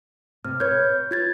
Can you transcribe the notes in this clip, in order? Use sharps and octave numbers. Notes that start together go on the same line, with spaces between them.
C3 F6
B4 C#5 G6 G#6
F4 G#6 A6